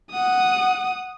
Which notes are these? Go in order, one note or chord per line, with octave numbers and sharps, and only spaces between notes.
F#5 D#6